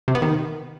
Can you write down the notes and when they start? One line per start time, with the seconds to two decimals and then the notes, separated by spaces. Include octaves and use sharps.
0.08 C3
0.15 B3
0.22 D#3